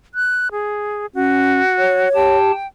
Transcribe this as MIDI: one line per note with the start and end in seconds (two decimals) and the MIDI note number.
0.15 0.48 90
0.52 1.06 68
1.15 1.61 61
1.15 2.09 66
1.78 2.37 73
2.15 2.51 67
2.15 2.67 79
2.15 2.51 81